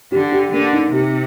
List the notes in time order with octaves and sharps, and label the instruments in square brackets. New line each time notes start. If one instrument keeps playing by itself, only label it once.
[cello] D3 [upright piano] G4
[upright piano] G4
[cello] D3 [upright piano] A#3
[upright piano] D#4
[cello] C3 [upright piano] G4